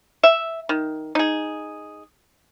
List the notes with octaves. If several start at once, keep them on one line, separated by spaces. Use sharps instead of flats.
E5
D#3
D#4 G#4